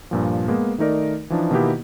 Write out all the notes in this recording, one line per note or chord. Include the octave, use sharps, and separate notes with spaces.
G2 A#2 F3
G#3 A#3 B3
D#3 A3 D#4 A#4 D5
E3 F3 D4 D#4
B2 D#3 A#3 B3 E4 G4